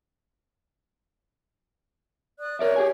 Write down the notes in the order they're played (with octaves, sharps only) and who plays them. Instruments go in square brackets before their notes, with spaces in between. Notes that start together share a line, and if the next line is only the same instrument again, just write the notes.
[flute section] D5 D#6 F#6
[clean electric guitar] A#4 D5 E5 [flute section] C#5
[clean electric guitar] G4 G#4 G#5